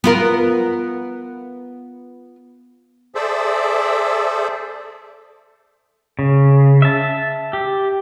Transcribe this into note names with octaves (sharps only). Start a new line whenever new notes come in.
B3 F4 A#4
G#4 A4 C5 D5 E5
C#3
E5 A5
G4